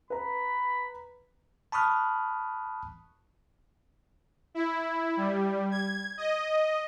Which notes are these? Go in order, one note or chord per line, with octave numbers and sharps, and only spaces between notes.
B4 A#5 B5
A5 B5 C#6 D#6 F6 F#6
E4
G3
G#6
D#5